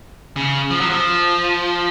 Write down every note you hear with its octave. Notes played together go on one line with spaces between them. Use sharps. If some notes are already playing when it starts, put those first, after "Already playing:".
C#3
F3
F#3
F3